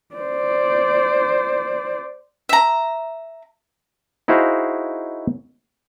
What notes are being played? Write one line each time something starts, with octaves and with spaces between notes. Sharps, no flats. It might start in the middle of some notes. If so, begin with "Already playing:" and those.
C5 D5
E5 A#5
D#4 E4 F#4 G#4 C5 F5